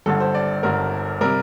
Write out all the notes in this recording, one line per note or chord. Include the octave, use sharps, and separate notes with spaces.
G1 G2 D3 A4
C5
D5
G1 G2 D3 A#4
C3 G3 A#4